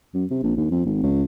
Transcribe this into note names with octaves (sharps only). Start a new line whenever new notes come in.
F#2
C3
A#1
D#2
F2
G#1
C#2